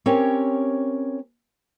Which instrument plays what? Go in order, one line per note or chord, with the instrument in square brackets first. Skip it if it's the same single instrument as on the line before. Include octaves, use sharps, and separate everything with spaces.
[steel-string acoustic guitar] C4 C#4 G4 A#4 C#5